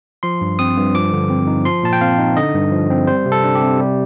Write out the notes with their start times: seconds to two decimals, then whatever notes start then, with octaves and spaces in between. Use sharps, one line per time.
0.23 F3 C6
0.41 G2
0.59 C4 D#6
0.77 G2
0.95 F3 D6
1.13 D3
1.30 C4
1.47 D#4
1.65 F3 C6
1.83 A#2 A5
1.93 G5
2.01 C4 F5
2.19 D#4
2.37 D3 D#5
2.55 G2
2.72 F3
2.90 C4
3.07 G3 C5
3.26 C3
3.32 A4
3.44 D4
3.55 G4
3.61 C3
3.79 G3